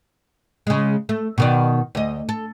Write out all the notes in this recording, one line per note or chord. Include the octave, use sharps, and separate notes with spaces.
C#3 G#3
A3
B2 D#3 D5
D2 D#5
A4